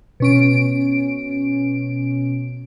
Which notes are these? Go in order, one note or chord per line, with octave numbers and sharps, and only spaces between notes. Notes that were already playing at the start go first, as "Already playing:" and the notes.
B2 C#4 D7